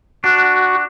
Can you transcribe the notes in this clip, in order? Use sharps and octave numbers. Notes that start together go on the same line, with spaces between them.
D4 F#4